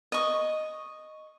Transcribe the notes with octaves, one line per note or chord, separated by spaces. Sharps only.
D#5 C#6